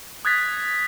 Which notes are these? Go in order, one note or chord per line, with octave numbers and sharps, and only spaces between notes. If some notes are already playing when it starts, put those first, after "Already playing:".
D#6 F#6 G#6 A6 B6